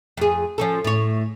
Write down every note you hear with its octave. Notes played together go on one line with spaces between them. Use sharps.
F2 G#4
F3 C#4 A4
A2 C#5